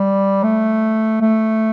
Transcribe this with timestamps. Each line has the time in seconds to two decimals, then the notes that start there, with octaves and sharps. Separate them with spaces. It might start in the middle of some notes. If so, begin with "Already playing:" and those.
Already playing: G3
0.44 A3
1.22 A3